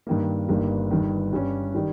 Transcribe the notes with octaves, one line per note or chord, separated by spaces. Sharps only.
G2 D#3 A#3
G1 G2 D#3 G3 A#3
G1 G2 D#3
G2 G3 C#4
D#3 G3